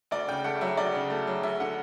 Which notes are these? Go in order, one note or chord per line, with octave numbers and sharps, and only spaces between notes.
D2 D5
C#3 G5
A3 F#5
F#3 E5
D2 D5
C#3
A3
F#3
D2 E5
D3 F#5